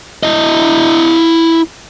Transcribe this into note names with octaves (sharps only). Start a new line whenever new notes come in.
E4 D#5